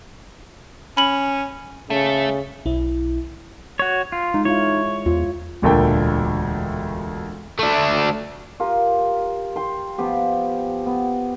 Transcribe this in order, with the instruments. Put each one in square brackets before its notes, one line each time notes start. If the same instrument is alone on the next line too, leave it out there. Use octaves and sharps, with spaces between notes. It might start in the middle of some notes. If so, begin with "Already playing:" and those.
[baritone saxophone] C#4 [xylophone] B5 F#7
[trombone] C#3 [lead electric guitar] A3
[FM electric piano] B1 E4
[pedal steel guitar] F#4 C#5
F4
[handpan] G#3 [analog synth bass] D#4
[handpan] E4 F4 F5 [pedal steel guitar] C#5
[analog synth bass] E2 [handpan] F4
[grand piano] E1 D2 A#2 A3 G5
[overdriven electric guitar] A3 D4
[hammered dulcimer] F4 G4 A#4
G5 C6
F3 B3 G4
B3